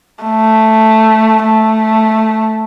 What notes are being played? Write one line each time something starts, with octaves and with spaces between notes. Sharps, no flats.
A3
A3